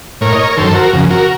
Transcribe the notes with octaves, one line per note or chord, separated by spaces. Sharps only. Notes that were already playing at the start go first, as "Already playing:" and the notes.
A2 A#4 C#5
D#5
A#4 C#5
A#4
F#2 D#3 A4 C5
F#4 A#4
F2 C#3
F#4 A#4